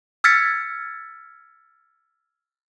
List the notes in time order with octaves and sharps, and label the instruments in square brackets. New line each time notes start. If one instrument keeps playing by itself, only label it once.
[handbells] E6 F6 G#6 A6 B6 C#7